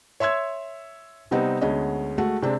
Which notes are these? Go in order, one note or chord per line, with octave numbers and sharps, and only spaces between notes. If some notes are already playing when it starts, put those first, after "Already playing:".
C#5 E5 C6 E6 G#6
C3 G3 B3 C4 D#4
D2 G#3 B3 C#4 D#5
G#3 A3 F#4
C3 G#3 C4 D4